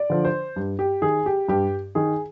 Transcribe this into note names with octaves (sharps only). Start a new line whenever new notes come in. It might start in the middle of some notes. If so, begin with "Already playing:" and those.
Already playing: D5
D3 F3
C5
G2
G4
D#3 G#4
G4
G2 G4
D#3 G#4